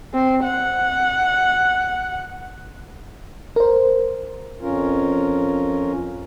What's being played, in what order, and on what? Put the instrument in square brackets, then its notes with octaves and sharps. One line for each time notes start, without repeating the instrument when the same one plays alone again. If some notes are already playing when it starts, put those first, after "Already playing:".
[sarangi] C4
F#5
[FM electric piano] A#4 C5
[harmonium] F2 C#4 F4 A#4